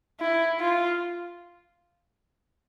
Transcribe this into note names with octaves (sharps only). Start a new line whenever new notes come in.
E4
F4